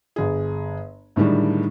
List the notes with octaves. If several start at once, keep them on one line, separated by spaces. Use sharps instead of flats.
G1 G#4
A2 D3 D#3 G3 G#3